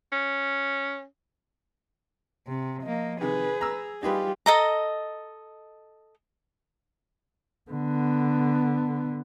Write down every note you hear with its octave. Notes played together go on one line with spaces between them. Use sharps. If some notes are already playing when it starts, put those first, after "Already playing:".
C#4
C3
F3 A#3 D#5
C3 D#3 G#4 B4
A#5 E6
G3 D#4 F4 G4 G#4 B4
A4 D#5 A#5
D3 B3